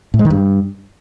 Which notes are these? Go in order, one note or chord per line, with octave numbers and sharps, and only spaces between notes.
A2
G#3
D#3
G2